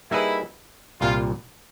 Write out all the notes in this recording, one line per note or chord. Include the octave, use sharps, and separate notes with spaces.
G3 A#3 D#4 E4 G#4 B4
C2 A#2 G3 F4